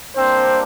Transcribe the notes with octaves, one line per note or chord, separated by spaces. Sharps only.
G3 A#3 C4 D4 C5